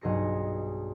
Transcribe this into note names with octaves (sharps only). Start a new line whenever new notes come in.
B1 G2 G#4 A#6 C#7